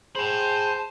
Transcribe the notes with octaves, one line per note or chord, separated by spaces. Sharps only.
G#4 C5 A5 B5